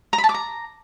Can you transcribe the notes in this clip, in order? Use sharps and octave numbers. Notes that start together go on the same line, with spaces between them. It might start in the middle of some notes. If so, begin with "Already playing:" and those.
A#5
B5
A5
D6
A#5